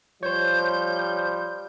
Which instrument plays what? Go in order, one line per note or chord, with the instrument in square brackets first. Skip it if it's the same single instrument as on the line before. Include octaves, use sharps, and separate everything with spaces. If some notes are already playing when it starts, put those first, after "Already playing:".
[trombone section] F3 G3 [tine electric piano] C5 C#5 [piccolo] G6